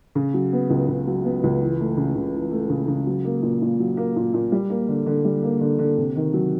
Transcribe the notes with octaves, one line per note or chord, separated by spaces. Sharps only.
C#3
F#3
B3
C#2
C#3
F#3
B3
C#2
E3
A3
C#3
C#3
E3
A3
C#3
C#3
F#3
A#3
A#2
A#2
F#3
A#3
A#2
A#2
G3
A#3
D3
D3
G3
A#3
D3
D3
C3
D#3
F#3